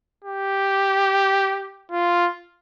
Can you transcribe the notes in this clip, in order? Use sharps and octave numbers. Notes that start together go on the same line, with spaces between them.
G4
F4